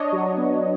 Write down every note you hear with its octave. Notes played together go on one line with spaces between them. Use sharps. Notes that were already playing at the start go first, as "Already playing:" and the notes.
Already playing: D4 C#5 D#5
F#3
B3